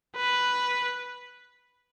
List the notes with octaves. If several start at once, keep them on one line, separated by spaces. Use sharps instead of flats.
B4